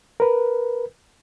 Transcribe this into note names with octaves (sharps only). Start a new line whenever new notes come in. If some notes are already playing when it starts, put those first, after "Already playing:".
A#4 B4